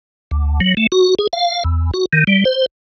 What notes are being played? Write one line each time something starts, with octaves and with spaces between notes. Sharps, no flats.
D2
F#3
A3
F#4
G#4
F5
E2
F#4
D#3
G3
C5